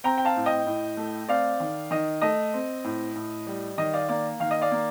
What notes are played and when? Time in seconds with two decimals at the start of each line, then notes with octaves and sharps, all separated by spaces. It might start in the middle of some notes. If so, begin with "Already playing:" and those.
0.04 C4 G5 A#5
0.18 G5
0.25 F5 A5
0.36 A2
0.46 D#5 G5
0.66 A2
0.97 A3
1.28 C4 D5 F5
1.60 D#3
1.91 D#3 D#5
2.22 A3 D#5
2.54 C4
2.84 A2
3.15 A2
3.47 G3
3.78 D#3 D#5
3.93 D5 F5
4.09 A#3 D5
4.40 D#3 F5
4.51 D#5
4.61 D5 F5
4.71 A#3